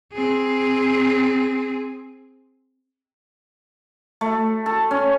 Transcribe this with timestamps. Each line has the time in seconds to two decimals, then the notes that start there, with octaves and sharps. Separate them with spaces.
0.13 C4 G#4
4.21 A3
4.66 A4
4.91 C#4